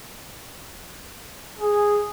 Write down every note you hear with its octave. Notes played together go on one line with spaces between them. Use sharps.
G#4